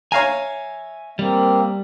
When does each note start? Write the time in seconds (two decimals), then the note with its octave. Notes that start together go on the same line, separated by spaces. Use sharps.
0.12 C#5 E5 F5 G#5 A#5
1.19 G3 A#3 C4